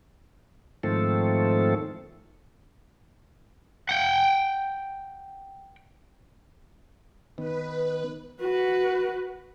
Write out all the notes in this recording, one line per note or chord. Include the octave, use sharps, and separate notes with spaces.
G#2 D#3 F3 A3 C4 A4
F#5 G5
D#3 B3 B4
F#4 B4